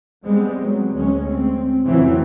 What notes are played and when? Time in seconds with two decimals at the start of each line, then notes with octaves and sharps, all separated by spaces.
0.25 G3 G#3 B3 C4
0.62 F#3
0.92 D2 G#3 C#4
1.26 C4
1.83 F2 A2 C#3 E3 F#3 C4